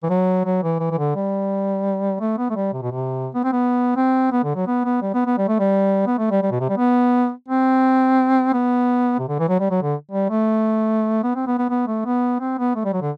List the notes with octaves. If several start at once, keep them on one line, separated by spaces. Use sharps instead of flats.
E3
F#3
F#3
E3
E3
E3
D3
G3
A3
B3
A3
G3
C3
B2
C3
B3
C4
B3
C4
B3
D3
F#3
B3
B3
G3
B3
B3
G3
A3
G3
B3
A3
G3
G3
B2
C3
G3
B3
C4
B3
C3
D3
E3
F#3
G3
F#3
D3
G3
A3
B3
C4
B3
B3
B3
A3
B3
C4
B3
A3
G3
F#3
D3